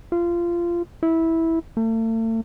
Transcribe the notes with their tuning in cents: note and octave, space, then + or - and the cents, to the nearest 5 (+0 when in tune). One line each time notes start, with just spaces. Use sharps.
F4 -20
E4 -10
A3 +40